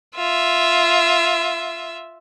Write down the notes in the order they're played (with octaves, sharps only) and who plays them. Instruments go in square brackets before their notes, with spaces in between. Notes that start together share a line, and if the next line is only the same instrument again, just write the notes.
[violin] F4 E5